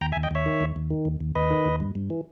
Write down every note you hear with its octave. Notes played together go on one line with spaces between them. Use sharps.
D#2 G5 A#5
E5 G#5
D#2
D#5 G5
D#2 C#5 E5
D#3
D#2
D#2
D#3
D#2
D#2
D#2 B4 D#5
D#3
D#2
G2
G2
E3